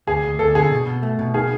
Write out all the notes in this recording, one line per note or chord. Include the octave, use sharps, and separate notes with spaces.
D2 G#4
D2
D2 A4
D3 G#4
B2
B2
A3
B2
D#3 G#4